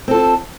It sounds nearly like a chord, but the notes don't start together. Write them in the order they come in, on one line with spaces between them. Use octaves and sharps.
C4 A4 F4